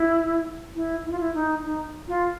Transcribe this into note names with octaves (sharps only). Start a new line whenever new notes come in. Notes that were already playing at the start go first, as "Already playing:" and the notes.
Already playing: E4
E4
E4
F4
E4
D#4
D#4
F4